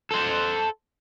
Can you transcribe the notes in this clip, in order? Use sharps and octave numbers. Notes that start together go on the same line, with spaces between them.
A4 C5